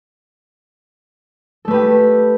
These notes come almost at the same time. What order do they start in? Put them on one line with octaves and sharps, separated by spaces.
A4 A3 B4 G4